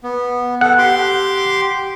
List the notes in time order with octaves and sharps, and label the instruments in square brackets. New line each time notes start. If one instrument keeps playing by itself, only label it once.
[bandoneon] B3
[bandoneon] A4 [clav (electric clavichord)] F#5
[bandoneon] G4 C6 D6